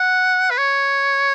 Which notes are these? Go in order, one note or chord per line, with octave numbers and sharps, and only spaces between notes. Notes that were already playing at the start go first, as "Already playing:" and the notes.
Already playing: F#5
B4
C#5